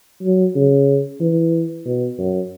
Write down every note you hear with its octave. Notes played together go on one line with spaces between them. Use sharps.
F#3
C#3
E3
B2
F#2